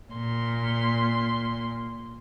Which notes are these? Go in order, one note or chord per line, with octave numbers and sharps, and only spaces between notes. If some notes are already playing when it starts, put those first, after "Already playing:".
A#2 C6